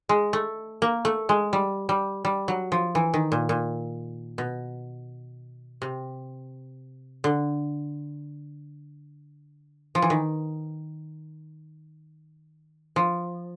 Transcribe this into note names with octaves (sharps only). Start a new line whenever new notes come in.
G#3
A3
A#3
A3
G#3
G3
G3
G3
F#3
F3
E3
D#3
A#2
A#2
B2
C3
D3
F3
E3
D#3
F3